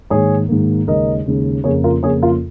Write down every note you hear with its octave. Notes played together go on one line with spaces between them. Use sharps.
G#2 D#3 A#3 G#4 C#5
G#2 D#3 A#3
D#2 C#3 G#3 C#4 A#4 D#5
D#2 C#3 G#3 C#4
F2 C#3 A#3 C#4 G#4 C#5
F4 A#4
F2 C#3 A#3 C#4 G#4 C#5
F4 A#4